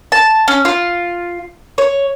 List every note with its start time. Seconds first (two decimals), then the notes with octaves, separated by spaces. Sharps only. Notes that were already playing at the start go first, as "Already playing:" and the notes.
0.12 A5
0.48 C#4
0.65 F4
1.78 C#5